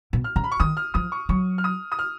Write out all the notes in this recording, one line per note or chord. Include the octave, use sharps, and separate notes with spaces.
B2
F6
C#3 A#5
B5
C#6
D#3 D#6
F6
F3 D#6
C#6
F#3 C#6
F6
D#6
D#6
F6